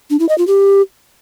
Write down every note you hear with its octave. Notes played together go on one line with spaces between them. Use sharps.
D4
E4
D#5
F4
G4